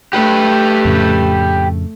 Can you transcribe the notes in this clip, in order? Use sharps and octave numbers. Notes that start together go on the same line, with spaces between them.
A3 G4 B4
F2 A2 C#3